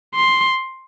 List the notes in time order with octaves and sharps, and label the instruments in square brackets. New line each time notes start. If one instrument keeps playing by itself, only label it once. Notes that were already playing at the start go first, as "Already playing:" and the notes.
[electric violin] C6